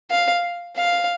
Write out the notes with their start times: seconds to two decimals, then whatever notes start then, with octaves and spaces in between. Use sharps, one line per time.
0.11 F5
0.77 F5